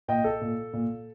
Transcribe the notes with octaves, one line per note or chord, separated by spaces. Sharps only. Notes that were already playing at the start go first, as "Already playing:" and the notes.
A#2 D#5 G5
A4
A#2
A#2